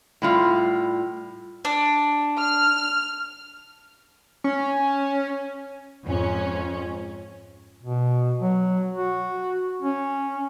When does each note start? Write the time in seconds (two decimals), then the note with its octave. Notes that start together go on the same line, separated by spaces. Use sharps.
0.22 A2 G3 F4
1.65 D4
2.39 F6
4.44 C#4
6.04 F2 G#2 C#4
7.83 B2
8.40 F#3
8.94 F#4
9.82 C#4